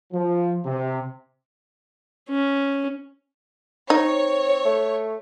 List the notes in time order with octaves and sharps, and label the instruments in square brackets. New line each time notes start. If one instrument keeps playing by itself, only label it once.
[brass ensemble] F3
C3
[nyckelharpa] C#4
[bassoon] C4 [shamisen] D#4 [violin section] C#5
[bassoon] A3